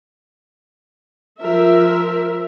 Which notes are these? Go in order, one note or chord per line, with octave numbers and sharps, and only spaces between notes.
F3 A#4 E5